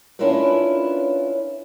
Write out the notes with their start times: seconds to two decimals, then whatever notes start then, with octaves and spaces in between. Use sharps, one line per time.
0.19 C#4 D4 E4 F4 A#4 B4